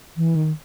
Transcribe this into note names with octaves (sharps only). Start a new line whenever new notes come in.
E3
D#3